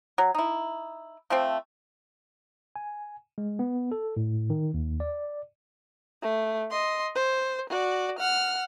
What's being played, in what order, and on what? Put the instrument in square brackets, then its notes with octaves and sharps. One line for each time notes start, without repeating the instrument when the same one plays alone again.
[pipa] F#3
D#4 E4
F3 A3 C4
[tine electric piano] G#5
G#3
B3
A4
A2
D#3
D#2
D5
[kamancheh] A3
D#5 C6
C5
F#4 D5
F#5 F6